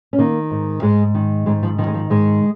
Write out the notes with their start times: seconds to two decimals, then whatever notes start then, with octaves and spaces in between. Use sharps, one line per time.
0.13 C#4
0.18 D#3 A#3
0.51 G#2
0.82 G#2 G#3
1.15 D#3
1.46 G#2 G#3
1.63 F3
1.78 D#3 F3
1.87 G#3
1.94 F3
2.10 G#2 G#3